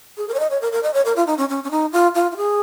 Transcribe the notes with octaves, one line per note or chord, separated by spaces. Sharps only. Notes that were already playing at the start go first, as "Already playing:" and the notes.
G#4
A#4
C#5
D#5
C#5
A#4
A#4
D#5
C#5
A#4
F4
D#4
C#4
C#4
C#4
D#4
F4
F4
F4
G#4